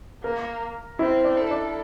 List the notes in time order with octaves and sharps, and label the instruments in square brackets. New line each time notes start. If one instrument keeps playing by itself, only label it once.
[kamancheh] A#3 [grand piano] A#4
[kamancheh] C4 [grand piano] E4
[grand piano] D4
[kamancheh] A4
[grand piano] D4